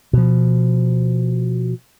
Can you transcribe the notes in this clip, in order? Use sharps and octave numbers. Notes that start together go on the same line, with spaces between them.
B2 F3